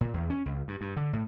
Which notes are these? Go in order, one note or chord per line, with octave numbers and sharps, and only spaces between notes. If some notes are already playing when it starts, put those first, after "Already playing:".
A#2
E2
C#4
C#2
G2
G2
D3
A2